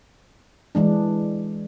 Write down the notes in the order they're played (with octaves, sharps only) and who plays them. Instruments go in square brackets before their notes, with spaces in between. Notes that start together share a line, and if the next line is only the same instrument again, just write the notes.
[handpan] E3 G#3 D4